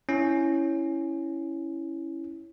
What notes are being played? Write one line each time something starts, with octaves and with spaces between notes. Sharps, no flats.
C#4 E4